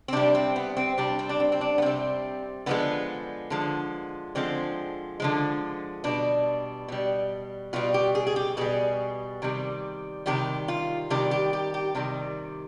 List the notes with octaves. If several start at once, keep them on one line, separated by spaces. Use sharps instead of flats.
C4
C3 G3 D4
C4
B3
C4
C3 G3 D4
C4
D4
C4
C4
D4
B3
C3 G3 C4
D3 F3 G#3 B3
D3 F3 G#3
D3 F3 G#3 C4
D3 F3 G#3
B2 G3 D4
B2 G3
B2 G3 F4
G4
G#4
G#4
G4
B2 G3 G#4
C3 D#3 G3
C3 D#3 G3 G4
F4
C3 D#3 G3 G4
G4
G4
G4
C3 D#3 G3